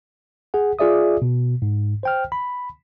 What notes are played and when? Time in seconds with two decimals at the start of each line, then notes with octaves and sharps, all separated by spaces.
0.54 G#4 F#5
0.79 F4 G#4 D5 E5 D#6
1.22 B2
1.62 G#2
2.03 C5 G5 F6
2.32 B5